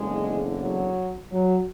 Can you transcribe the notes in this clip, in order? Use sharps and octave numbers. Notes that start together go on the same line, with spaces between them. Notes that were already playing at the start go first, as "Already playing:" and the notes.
Already playing: F#1 E2 D3 G#3
F#3
F#3